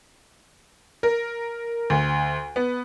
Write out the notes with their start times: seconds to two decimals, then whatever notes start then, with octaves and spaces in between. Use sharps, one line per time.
1.03 A#4
1.90 D2
2.56 B3